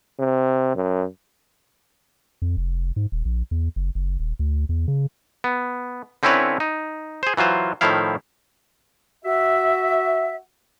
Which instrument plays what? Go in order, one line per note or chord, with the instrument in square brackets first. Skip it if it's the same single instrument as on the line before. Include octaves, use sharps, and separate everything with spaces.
[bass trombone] C3
F#2
[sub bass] F2
F1
G#2
D#1
A#1
E2
F#1
F#1
D#1
D2
E2
C#3
[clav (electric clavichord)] B3
D3 C4 C#4 E4 B4 C#5
D#4
G#4 C5
E3 F#3 F4 C5
A2 D#3 F3 E4 F5
[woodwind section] F#4 E5